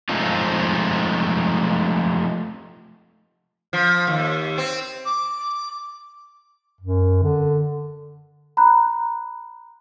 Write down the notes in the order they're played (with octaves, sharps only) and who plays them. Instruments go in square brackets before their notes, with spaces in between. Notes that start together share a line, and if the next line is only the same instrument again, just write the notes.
[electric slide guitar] F3 G#3 A3 C4 D#4 F4
[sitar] F3
D#2
C4
[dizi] D6
[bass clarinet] F#2
D3
[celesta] A#5 B5 F#6